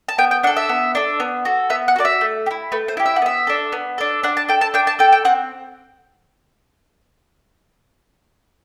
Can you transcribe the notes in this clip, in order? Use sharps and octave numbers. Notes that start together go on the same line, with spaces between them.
A5
B3 G5
G5
D4 A4 F#5
E5
B3
D4 A4
B3
F#4 A4
B3 E5
F#5
F#4 A4 D5
E5
A3
G4
E4
A3 B4
C5
E4 G4
E5
F#5
B3 E5
D4 A4
B3
D4 A4
D4 F#5
A5
A4 G5
A5
D4 G5
A5
A4 G5
G5
C4 F#5